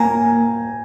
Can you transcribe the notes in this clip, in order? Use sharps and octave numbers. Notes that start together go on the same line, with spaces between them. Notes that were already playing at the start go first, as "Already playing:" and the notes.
Already playing: A#3 G5 G#5 A#5